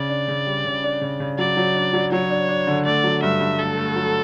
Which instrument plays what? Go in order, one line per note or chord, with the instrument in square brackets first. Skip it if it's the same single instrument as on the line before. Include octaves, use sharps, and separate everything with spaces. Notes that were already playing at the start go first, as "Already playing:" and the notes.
Already playing: [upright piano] C#3 [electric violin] D5
[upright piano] D4
C#3
G3
C#3
D4
C#3
C#3
[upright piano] F#3 [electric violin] D5
[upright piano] F#3
D4
F#3
[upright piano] F#3 [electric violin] C#5
[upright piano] D4
D4
D3
[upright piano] A3 [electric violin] D5
[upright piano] F#3
[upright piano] G2 [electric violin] E5
[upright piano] G2
[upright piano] A3 [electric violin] A4
[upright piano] A3
F#3